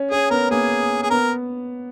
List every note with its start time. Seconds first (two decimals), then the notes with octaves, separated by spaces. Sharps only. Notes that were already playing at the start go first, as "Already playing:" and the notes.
Already playing: C#4
0.11 C#4 G#4
0.31 B3 A#4
0.51 A#3 G#4
1.03 G#4
1.11 B3 A#4